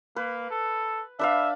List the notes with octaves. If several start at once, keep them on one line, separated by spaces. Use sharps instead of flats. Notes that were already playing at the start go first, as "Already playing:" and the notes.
A#3 B4
A4
D4 B4 E5 F5